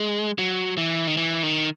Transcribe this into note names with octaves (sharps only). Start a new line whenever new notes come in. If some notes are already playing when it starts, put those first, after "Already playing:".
Already playing: G#3
F#3
E3
D#3
E3
D#3